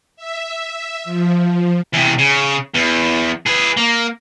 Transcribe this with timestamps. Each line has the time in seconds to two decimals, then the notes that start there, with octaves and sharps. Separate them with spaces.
0.16 E5
1.04 F3
1.93 E2 C3
2.18 C#3
2.74 E2
3.46 G#4 B4
3.77 A#3